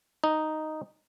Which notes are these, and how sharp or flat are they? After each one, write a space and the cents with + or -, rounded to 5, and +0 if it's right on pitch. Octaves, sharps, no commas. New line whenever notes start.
D#4 +0